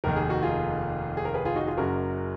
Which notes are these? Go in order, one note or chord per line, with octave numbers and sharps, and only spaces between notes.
F1 D#2 D#3 A#4
G#4
F#4
F4 G#4
G#4
A#4
G#4 B4
F4 G#4
D#4 F#4
F4 G#4
F#1 F#2 C#3 F#4 A#4